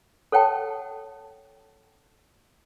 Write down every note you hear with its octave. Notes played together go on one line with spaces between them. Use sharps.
A4 C#5 F#5 G5 A5